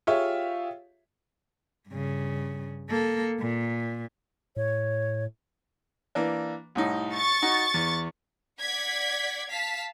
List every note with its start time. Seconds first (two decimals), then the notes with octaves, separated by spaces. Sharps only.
0.07 F4 G4 G#4 C#5 E5 F5
1.89 G2 C#3
2.90 A#3 A4
3.40 A#2
4.56 A2 C#5
6.15 E3 A#3 D4
6.75 C2 A2 D#4
7.14 C#6 A6
7.42 D#4 F#4
7.74 E2
8.60 D5 F#5 G#6 B6
9.50 F5 A5 B6